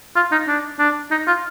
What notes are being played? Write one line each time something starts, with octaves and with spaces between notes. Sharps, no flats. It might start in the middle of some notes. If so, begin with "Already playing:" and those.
F4
D#4
D4
D4
D#4
F4